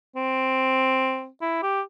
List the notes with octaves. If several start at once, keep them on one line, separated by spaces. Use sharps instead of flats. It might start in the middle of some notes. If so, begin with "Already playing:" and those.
C4
E4
G4